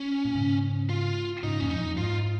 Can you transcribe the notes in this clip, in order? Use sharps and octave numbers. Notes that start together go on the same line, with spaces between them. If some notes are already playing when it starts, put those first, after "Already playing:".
Already playing: C#4
A#2
G#2 C#3
F4
G#2 C#3 D#4
F2 A#2 C#4
D#4
F2
G#2 F4